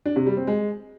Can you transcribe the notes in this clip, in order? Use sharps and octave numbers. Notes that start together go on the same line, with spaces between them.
D4
C3
G3
C4
G#3